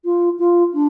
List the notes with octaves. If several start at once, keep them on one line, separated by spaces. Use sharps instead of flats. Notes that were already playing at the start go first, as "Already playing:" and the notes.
F4
F4
D4